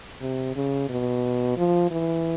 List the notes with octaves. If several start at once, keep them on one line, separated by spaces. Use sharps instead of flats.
C3
C#3
B2
F3
E3